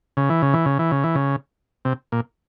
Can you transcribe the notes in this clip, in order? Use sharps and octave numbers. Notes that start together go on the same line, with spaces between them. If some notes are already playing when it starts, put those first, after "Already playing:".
C#3
E3
C#3
E3
C#3
E3
C#3
E3
C#3
C3
A#2